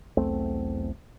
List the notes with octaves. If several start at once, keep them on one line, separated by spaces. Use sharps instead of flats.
B1 E2 A3 C4